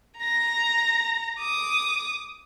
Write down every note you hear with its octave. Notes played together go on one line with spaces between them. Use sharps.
A#5 A#6
D6 D#6